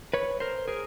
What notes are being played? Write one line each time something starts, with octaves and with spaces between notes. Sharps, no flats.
B4 C#5
A#4 C5
G#4 A#4